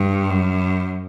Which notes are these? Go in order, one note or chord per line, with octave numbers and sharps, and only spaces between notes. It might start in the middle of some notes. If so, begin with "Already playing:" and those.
Already playing: G2
F#2